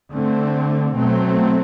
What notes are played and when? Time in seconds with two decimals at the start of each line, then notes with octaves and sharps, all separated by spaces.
0.11 D3 A3 C4
0.94 B2 F#3 A3 C4